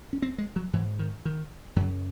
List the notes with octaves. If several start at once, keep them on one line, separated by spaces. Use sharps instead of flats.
C#4
C4
G#3
F#3
G#2 E3
D#3
D#3
F#2 C#3 F#3